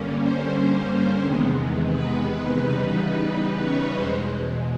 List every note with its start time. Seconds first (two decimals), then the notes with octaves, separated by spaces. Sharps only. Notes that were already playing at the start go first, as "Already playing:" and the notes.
Already playing: G2 D3 G3 A#3 C#4
0.22 C5
1.24 E2 C3 D#3 G#3 B3
1.92 B4
2.60 C#3 E3 G3 B3 D#4 B4
2.94 B4
3.28 B4
3.62 C#4 C#5
3.96 E2 B2 G#3 C5